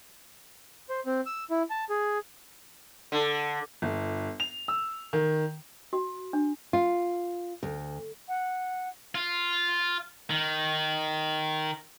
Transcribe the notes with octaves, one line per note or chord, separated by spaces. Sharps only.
C5
C4
E6
E4
A5
G#4
D3
G1
F7
E6
D#3
F#4
D4
F4
D2
F#5
F4
D#3